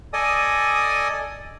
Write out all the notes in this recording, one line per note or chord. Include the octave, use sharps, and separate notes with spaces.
A4 D5 D#5 G#5 D#6